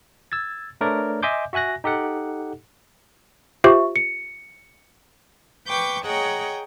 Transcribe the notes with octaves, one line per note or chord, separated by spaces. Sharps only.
E6 G#6 A6
A3 D4 A#4 B4 C#5 D5
D#5 E5 G#5 C6 D6 G6
F#4 E5 G#5 F#6 A#6
D#4 G4 A4 F#5
F4 G4 C5 E5 C#6
C#7
B4 G5 C#6 D6 G6
G#4 C#5 D#5 F#5 G5 A#5